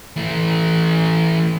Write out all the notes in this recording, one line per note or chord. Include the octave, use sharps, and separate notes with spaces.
E3 A3